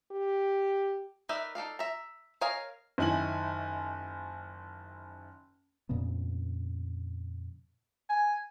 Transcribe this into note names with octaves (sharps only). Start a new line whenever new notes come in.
G4
D#4 A#4 B4 D5 E5
D#4 A4 D5 F5
E5 A#5
A#4 C#5 D#5 F5 G#5
F#1 D#3 E4 G#5 F#7
F2 A#2 C#3 B3
G#5